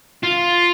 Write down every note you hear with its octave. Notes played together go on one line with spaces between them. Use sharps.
F4